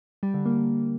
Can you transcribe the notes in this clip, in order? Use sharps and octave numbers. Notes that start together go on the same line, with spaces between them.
G3
D3
A#3